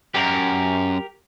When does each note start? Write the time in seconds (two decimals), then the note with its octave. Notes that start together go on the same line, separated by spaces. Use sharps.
0.14 F#2 G4 A#4